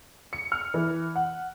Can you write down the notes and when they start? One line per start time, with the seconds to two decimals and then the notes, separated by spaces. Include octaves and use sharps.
0.33 C#7
0.52 F6
0.74 E3
1.15 F#5